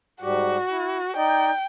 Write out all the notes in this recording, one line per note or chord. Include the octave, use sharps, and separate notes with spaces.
G#2 G3 F#4 G4
E4
D#4 D5 D#5 G5